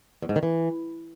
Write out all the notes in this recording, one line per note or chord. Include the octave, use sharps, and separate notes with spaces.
E2
G#2
D#3
E3